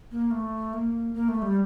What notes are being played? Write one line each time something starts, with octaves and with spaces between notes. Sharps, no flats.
A#3
A3
A#3
A#3
A3
G3